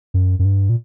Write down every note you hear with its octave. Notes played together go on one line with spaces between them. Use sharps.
F#2
F#2
G2
A#2